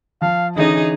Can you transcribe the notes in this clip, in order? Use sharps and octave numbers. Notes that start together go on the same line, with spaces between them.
F3 F5 A5
D3 E3 C#4 D#4 G#4 D#5